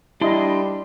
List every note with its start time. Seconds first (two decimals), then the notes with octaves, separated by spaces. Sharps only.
0.21 G3 D4 E4 D#5 C6